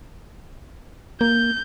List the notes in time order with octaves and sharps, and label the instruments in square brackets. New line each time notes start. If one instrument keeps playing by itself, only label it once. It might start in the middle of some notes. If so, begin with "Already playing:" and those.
[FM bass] A#3 [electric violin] G6